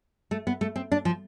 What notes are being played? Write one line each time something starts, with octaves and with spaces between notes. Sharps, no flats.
A3
B3
A3
C4
D4
F3